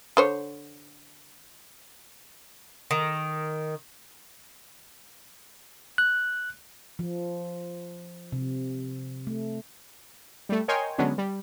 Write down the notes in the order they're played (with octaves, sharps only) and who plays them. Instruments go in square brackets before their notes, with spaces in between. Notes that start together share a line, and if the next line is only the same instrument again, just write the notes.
[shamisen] D3 C5 C#5
[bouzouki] D#3
[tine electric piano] F#6
[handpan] F3
C3
A3
[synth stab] G3 A3
A#4 C#5 D#5 G5 G#5 C6
D3 F#3 G#3 B3 C#4 D4
G3